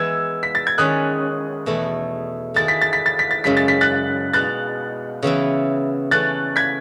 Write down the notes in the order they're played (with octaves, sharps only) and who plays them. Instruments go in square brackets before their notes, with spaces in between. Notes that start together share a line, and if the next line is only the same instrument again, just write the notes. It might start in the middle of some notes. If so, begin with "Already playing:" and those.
Already playing: [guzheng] E3 G#3 B3 [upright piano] E6 G#6
[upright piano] B6
A6
G#6
[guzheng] D#3 G#3 C#4 [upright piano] D#6 F#6
[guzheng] E2 B2 A3 E4
[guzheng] D#3 A3 E4 G#4 [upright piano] A6
[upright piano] B6
A6
B6
A6
B6
A6
[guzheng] F#2 C#3 G#3 [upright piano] B6
[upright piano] A6
B6
F#6 A6
[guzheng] B2 G#3 D#4 [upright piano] F#6 A6
[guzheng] C#3 E3 B3 E4
[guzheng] E3 A3 C#4 [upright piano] F#6 A6
[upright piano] G#6 B6